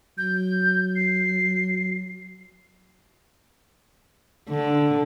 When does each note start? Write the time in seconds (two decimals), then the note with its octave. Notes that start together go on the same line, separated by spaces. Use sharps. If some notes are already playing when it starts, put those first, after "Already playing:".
0.18 F#3 G6
0.96 C7
4.50 D3